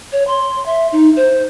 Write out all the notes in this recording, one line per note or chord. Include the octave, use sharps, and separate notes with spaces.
C#5
C6
E5
D#4
C5